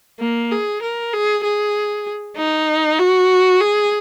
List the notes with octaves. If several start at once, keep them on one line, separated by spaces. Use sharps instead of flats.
A#3
G#4
A#4
G#4
G#4
D#4
F#4
G#4